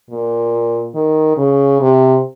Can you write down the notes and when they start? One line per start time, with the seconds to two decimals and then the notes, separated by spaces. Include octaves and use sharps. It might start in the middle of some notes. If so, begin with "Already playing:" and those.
0.10 A#2
0.95 D#3
1.38 C#3
1.81 C3